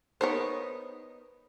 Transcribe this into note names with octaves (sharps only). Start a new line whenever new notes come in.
B3 D#4 A#4 C5 C#5